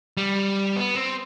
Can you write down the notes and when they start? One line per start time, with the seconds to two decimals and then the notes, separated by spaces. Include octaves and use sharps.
0.17 G3
0.76 B3
0.95 C4